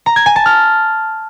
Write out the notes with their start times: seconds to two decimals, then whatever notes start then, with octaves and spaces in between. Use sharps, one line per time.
0.06 A#5
0.16 G#6
0.26 G#5
0.36 A5
0.46 F6